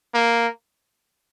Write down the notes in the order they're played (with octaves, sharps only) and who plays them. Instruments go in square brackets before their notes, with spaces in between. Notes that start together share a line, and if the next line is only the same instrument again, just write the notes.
[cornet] A#3